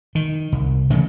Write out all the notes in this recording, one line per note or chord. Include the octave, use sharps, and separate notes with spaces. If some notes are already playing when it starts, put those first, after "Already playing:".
D#3
C2
C#3 E3 A3